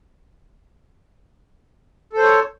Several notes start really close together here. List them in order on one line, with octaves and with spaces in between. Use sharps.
A4 C5 C#5